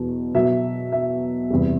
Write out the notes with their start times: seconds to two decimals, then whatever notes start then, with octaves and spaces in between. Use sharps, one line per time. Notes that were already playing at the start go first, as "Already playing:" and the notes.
Already playing: E2 B2 F#3
0.34 B2 F#3 E5
0.92 E5
1.50 E2 C3 G3